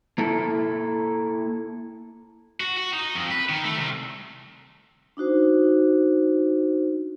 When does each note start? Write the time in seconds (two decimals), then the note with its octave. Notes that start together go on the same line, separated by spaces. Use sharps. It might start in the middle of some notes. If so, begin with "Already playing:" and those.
0.18 A#3 E4 A4
2.60 F#4
2.77 F#4
2.93 D#4
3.15 F2
3.31 B4
3.49 D#3
3.65 A3
3.77 C2
5.17 D4 D#4 F#4 C5